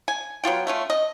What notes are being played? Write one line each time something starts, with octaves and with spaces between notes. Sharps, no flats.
G#5
F#3 B3 F4 G5
A3 C#4 F4
D#5